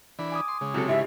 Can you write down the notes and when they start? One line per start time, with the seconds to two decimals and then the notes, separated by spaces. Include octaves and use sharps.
0.19 E3 D4 B5
0.32 G#5 D6 D#6
0.48 C6
0.61 C#3 G#3
0.74 C3 F#3 A4
0.88 G#1 E4 G4 E5